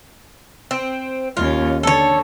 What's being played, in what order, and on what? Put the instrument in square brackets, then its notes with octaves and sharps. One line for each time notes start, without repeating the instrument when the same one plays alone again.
[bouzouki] C4
[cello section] D#2 C#4 [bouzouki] F4
[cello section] D3 [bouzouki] A4 C#5